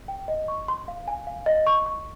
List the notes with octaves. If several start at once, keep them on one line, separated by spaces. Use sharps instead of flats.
G5
D#5
C#6
C6
F5
G#5
F5
D#5
C#6
C#6